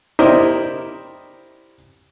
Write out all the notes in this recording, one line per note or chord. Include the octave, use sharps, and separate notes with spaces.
E4 G4 A#4 C5 D5 D#5